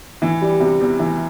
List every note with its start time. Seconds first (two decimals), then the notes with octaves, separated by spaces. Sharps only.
0.22 E3
0.41 G3
0.60 C3
0.80 E2
0.99 E3